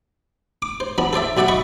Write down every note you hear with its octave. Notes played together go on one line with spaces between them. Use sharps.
D6
C5
F3 B3 D4
A4 C5 D5 E5
B1 F#4 D5 E5 F#5
D#5 B5 C#6